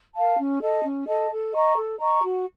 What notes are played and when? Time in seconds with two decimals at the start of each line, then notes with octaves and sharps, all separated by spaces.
0.16 A#4 F5 A5
0.39 C#4
0.62 A4 D#5 A5
0.84 C#4
1.07 A4 D#5 A5
1.31 A4
1.53 D#5 A#5 C#6
1.77 A4
2.00 D#5 A#5 C#6
2.22 F#4